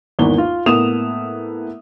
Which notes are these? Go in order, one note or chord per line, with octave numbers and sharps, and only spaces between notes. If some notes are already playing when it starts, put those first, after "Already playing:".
G#1 E2 A#3 B3 G7
F4
A2 A#3 B3 D#6 E7 F7